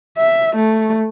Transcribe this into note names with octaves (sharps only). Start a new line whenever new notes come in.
E5
A3